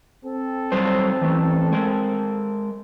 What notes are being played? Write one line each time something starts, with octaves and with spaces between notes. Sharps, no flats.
C4 A4
F#3 G3 C5
E3 A3
G#3 A#4